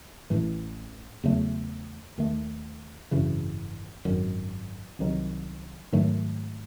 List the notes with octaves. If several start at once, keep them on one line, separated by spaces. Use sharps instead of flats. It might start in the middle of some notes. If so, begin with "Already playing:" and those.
A1 A2 E3 A3
E2 C#3 F#3 A3
D#2 D#3 A3
G#1 F#2 C#3 E3
G#1 F#2 D#3
C2 C3 D#3 F#3
G#2 D#3 F#3 A3